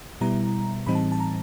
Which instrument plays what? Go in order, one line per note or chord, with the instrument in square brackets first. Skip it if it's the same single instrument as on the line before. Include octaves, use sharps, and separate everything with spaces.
[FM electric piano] B2 G3 B3 E4 A#5
A2 E3 G3 C4 D#4 B5
A5
A5
A#5